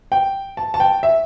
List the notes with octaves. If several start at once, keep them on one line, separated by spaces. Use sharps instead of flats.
G5
A5
A5
G5
E5